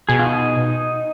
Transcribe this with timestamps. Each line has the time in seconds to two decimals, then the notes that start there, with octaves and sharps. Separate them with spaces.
0.09 B2 G#4
0.19 F4
0.25 D#4